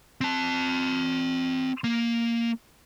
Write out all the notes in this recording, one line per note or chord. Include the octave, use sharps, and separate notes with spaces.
C4 A5
A#3